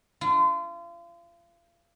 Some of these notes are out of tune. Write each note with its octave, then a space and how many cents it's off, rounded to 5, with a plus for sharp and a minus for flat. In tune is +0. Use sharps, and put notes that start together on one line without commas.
F4 -35